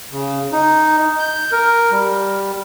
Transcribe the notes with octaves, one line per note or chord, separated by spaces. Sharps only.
C#3
D#4
G6
A#4
G3